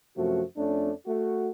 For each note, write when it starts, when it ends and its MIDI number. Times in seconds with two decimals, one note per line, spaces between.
0.17 0.41 42
0.17 0.41 48
0.17 0.41 53
0.17 0.41 57
0.17 0.41 66
0.56 0.90 41
0.56 0.90 57
0.56 0.90 61
0.56 0.90 62
1.06 1.48 57
1.06 1.48 66